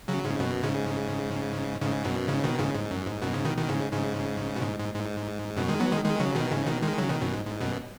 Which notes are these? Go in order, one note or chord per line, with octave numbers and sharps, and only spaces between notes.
C#3 F#3
G#2 C#3
F#2 B2
G#2 C#3
G#2 C#3
F#2 B2
G#2 C#3
B2 D#3
G#2 C#3
G#2
F#2
G#2
F#2 B2
G#2 C#3
B2 D#3
B2 D#3
G#2 C#3
G#2 C#3
B2
G#2
G#2
G#2
F#2 B2
D#3 G#3
F#3 B3
D#3 G#3
D#3 G#3
C#3 F#3
B2 D#3
G#2 C#3
B2 D#3
D#3 G#3
C#3 F#3
B2 D#3
F#2 B2
G#2
G#2
F#2 B2